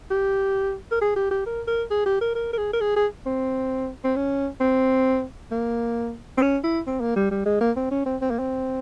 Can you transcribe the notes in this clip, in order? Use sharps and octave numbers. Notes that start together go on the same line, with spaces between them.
G4
A#4
G#4
G4
G4
A#4
A#4
G#4
G4
A#4
A#4
A#4
G#4
A#4
G#4
G#4
C4
C4
C#4
C4
A#3
C4
C#4
E4
C4
A#3
G3
G3
G#3
A#3
C4
C#4
C4
C4
A#3
C4